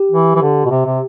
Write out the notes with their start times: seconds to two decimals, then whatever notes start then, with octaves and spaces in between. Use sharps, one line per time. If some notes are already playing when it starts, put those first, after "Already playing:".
Already playing: G4
0.12 E3
0.36 E3
0.42 D3
0.65 B2
0.71 C3
0.86 C3